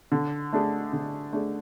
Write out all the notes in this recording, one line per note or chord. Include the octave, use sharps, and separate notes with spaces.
D3
A3 D4 G#4
D3
A3 D4 G#4